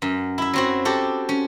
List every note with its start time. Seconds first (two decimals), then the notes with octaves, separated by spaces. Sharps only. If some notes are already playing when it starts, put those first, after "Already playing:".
0.02 F#2
0.38 E4 E5
0.53 F#3 C4 F#4
0.85 F#4 G4 A4
1.29 C#4